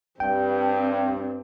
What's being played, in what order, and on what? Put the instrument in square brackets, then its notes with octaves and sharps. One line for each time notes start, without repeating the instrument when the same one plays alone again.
[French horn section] G2 [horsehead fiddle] C4 [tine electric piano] G5